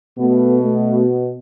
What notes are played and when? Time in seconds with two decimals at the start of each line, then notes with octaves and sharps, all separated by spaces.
0.19 B2 A3 B3
0.62 A3
1.05 B3